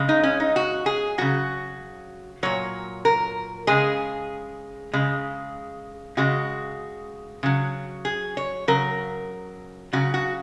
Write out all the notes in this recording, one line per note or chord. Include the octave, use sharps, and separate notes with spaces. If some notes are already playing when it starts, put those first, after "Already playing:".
Already playing: C#3 G#3
D#4
C#4
D#4
F#4
G#4
C#3 F#3 F#4
A#2 F#3 C#5
A#4
C#3 G#3 G#4
C#3 G#3
C#3 G#3 F#4
C#3 F#3
G#4
C#5
C#3 F#3 A#4
C#3 F#3 F#4
F#4